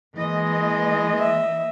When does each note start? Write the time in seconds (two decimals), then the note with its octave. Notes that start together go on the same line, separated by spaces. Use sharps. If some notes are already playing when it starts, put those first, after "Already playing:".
0.16 E3 G#3 A#3 D#5
1.19 E5